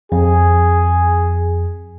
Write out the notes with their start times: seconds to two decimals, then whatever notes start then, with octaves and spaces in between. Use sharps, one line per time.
0.12 F2 G#4